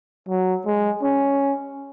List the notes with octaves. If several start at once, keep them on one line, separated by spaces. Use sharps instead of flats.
F#3
G#3
C#4